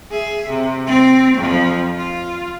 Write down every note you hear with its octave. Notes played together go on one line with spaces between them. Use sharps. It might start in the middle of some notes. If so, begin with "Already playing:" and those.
G#4 E5
C3
C4
F2 F3
F4